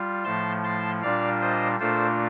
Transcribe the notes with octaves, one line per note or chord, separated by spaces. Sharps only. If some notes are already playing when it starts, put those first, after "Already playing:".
Already playing: G3 F4
A2 F3 A3 A5 C6
A5 C6
A#2 G3 D4 F4 D5 F5
C5 D#5
A#2 A3 D4 F4 A4 C5